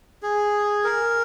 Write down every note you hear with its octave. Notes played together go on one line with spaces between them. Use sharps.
G#4
A#4